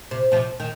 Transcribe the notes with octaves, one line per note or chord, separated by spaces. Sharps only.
C3
C3 F3
D#3